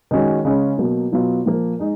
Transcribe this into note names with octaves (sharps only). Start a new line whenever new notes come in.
D#3 G#3 C#4 F#4
C#3 G#3 C#4
B2 F#3 A#3
B2 F#3 B3 F4
A#2 F3 A#3
G#3 D#4